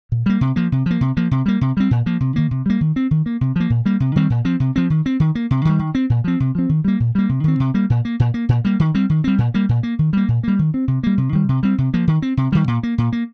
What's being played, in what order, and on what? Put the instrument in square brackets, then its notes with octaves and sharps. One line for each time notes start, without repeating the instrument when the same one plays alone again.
[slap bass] A#2
G3 A#3
C3
F3 A#3
C3
F3 A#3
C3
F3 A#3
C3
G3 A#3
C3
G3 C4
A#2
F3 A#3
C3
D#3 A#3
C3
G3 A#3
D#3
C4
D#3
A#3
C3
F3 A#3
A#2
G3 A#3
C3
D#3 G3 C4
A#2
F3 C4
C3
F3 C4
D#3
C4
D#3
A#3
C3
D#3 G3
D#3
C4
A#2
F3 C4
C3
F3 C4
D#3
G3 A#3
A#2
G3 A#3
C3
D#3 C4
C3
G3 A#3
A#2
A#3
A#2
A#3
A#2
G3 A#3
D#3
G3 C4
D#3
G3 C4
A#2
G3 A#3
A#2
A#3
D#3
G3 A#3
A#2
G3 A#3
D#3
C4
C3
G3 A#3
C3
D#3 G3
C3
G3 C4
C3
F3 A#3
D#3
C4
C3
D#3 G3
A#2
A#3
A#2
A#3